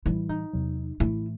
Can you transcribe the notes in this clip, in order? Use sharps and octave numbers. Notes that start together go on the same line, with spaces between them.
A2 E3 G3 E4
D#4
E2 C3 F#3
A2 E3 A3 E4